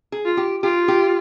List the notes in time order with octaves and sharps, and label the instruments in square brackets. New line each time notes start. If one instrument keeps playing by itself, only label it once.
[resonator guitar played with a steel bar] G#4
[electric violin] F4
[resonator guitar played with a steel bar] G4
[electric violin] F4 [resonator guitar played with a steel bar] G4
[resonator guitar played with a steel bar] G4